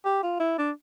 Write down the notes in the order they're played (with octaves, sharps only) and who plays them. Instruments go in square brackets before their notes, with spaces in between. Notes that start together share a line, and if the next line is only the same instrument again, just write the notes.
[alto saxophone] G4
F4
E4
D4